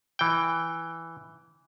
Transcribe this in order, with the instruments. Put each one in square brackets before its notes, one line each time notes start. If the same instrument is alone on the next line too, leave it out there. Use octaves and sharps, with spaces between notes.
[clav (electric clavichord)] E3 G5